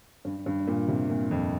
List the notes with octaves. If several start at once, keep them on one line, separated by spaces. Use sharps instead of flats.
G2
G2
A#2
C3
A#2
F2